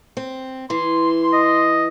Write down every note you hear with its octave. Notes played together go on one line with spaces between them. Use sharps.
C4
E3 C6
D#5